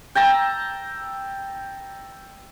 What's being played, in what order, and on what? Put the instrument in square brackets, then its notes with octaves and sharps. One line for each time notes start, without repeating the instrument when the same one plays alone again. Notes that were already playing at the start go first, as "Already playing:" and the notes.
[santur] G5 A5 A#5 E6